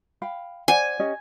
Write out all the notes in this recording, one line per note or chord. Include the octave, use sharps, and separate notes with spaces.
F5 G5 B5
C5 D5 F#5 G#5
C#4 G4 D#5